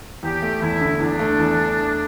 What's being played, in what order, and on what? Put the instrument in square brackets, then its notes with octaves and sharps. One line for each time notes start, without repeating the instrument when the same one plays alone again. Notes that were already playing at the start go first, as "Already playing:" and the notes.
[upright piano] E2 [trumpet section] G4
[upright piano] A3
[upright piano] E2 [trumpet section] E4
[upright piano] D3
[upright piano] E2 [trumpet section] D4
[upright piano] A3
E2